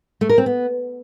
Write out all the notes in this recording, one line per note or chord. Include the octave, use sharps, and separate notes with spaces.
A3
A#4
C4
B3